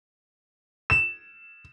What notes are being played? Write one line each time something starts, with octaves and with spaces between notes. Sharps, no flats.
E7